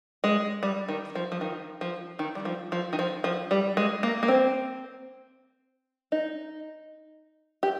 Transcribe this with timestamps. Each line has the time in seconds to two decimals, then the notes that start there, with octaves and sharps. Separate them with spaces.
0.24 G#3
0.63 G3
0.88 D#3
1.15 F3
1.32 F3
1.41 D#3
1.81 F3
2.19 D#3
2.35 G3
2.45 F3
2.72 F3
2.93 D#3
2.99 F3
3.24 F3
3.51 G3
3.77 G#3
4.03 A#3
4.23 A#3
4.28 C4
6.12 D#4
7.63 G4